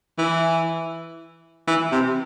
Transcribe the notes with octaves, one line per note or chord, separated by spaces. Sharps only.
E3
E3
C3